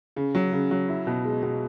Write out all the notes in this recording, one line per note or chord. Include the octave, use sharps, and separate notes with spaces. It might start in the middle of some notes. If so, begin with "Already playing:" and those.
C#3
F#3
C#3
F#3
E4
B2
G#3
B2